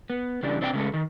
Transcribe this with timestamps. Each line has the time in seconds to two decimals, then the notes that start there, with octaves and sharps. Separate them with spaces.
0.10 B3
0.43 C#3 E3 G3 D4
0.61 C3 C4 D4 F4 C5 G5
0.73 C#3 G#3 A3
0.94 D#3